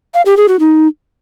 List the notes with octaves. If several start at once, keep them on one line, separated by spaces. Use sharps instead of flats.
F5
G4
G#4
F#4
D#4